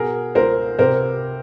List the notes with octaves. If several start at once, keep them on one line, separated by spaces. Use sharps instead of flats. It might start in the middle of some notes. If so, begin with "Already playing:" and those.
Already playing: B2 G#4 A#4
C#2 A#4 C5
C3 A#4 C5